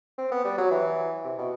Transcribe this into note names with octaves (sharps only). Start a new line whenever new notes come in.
C4
B3
G3
F#3
E3
C3
B2